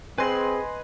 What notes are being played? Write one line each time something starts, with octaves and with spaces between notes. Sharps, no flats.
C4 G#4 B4 D#5 G#5 B5 C6